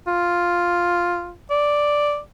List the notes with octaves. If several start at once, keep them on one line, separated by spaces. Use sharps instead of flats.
F4
D5